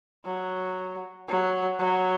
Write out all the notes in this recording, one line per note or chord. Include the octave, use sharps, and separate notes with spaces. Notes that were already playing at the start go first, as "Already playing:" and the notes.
F#3
F#3
F#3